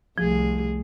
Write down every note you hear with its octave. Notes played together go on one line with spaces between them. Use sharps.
C2 F3 A3 G#4